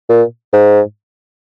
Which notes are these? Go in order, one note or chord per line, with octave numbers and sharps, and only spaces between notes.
A#2
G#2